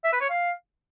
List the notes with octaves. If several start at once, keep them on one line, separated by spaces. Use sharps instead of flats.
E5
B4
C#5
F5